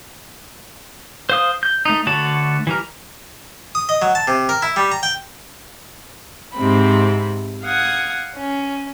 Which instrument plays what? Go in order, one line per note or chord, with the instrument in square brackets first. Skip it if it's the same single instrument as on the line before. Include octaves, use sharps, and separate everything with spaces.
[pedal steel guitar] C5 F5 D#6
G6
A3 D#4
D3 A3 F#4 C#5 A5
E3 G3 A#4
[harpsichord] D#6
D#5
F#3
A5
C3
A#4
E4
G3
A#5
G5
[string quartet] G#2 C3 C4 B5
F5 F#5 D#6 G#6
C#4